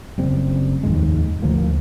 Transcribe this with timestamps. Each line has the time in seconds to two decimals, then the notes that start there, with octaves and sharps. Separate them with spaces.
0.18 F#1 G3 C4
0.83 F1 D#2 G#2 G#3
1.42 D2 F3 A#3